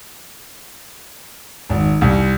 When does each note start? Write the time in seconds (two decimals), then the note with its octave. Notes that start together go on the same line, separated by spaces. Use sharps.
1.69 G#1
2.01 C2